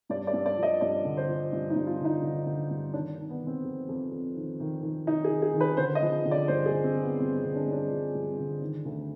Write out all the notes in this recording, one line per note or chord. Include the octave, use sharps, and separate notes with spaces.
G2 D5
D5
G2
D5
F3
D#5
G2 D5
D3
C5
F3
G2
D#4
G2
F4
D3
D#4
D3
D3
G2
D#3 D4
D#3
B3
D#3
C4
F2
F2
F2
D#3
D#3
D#3
D#3 D#4
G#4
D#3
G#4
D#3
B4
D3 C5
D#5
F3
D3
D5
G2 C5
G#4
D3
C4
F3
B3
G2 C4
C4
D3
D4
G2
D4
F3
G2
D3
D#3
D2